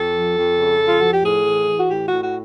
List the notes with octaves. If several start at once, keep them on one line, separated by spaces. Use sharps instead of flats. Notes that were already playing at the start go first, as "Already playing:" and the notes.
Already playing: F2 A4
F3
F2
C#3
F2
F4
F3 F#4
G4
A2 G#4
E3
E3
F#4
A2 G4
F#4
A2
F#4